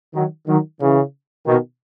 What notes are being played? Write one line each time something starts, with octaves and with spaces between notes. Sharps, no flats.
D#3 F#3
D#3 F#3
C#3 E3
B2 D#3